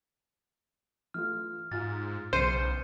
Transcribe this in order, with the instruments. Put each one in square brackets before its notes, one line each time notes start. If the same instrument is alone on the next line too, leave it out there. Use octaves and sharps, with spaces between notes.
[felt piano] E3 A3 F4 [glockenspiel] F6
[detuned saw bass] G#2 [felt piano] F4 F6 [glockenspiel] A6
[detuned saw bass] B1 [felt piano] E2 C#3 E3 [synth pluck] C5 [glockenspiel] G6 C#7 D#7